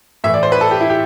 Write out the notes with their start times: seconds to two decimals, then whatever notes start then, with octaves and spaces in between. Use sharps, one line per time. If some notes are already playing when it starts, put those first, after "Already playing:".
0.24 A2 E3 E5
0.34 D5
0.43 C5
0.52 B4
0.61 A4
0.71 G4
0.80 E4
0.89 G4